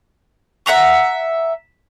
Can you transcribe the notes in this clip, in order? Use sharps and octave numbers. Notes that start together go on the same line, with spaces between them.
E5 F#5 A#5 C#6